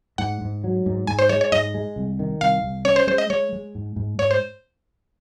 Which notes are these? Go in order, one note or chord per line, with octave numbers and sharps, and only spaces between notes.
G#2 F#5
G#2
F#3
G#2
G#2 G#5
C5
G#3 C#5
C#5
G#2 D#5
G#3
C2
D#3
C2 F5
C2
C#4 C#5
C5
G#3 C5
D#5
G#3 C#5
G#3
G#2
G#2
G#2 C#5
C5